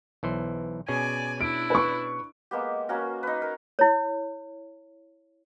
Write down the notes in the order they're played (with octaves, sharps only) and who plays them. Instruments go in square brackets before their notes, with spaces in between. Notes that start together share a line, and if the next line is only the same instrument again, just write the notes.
[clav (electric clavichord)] B1 E3 C5
[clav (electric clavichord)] B2 C#4 G#4 [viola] D5 G#5
[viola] D4 E4 [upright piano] D7
[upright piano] B4 C#6
[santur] G#3 A#3 B3 G4
A#3 C#4 F#4 A#4
D#4 B4
A#4
[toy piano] E4 C#5